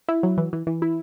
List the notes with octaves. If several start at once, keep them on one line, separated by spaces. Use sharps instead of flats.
E4
F#3
E3
E3
E3
E4